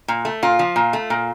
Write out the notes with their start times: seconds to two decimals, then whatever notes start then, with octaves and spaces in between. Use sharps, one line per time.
0.08 A#2
0.25 A3
0.43 A#2 F4
0.59 F3
0.76 A#2
0.93 A3
1.10 A#2